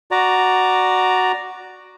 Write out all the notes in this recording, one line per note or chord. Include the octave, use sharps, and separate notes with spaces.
F#4 D5 A#5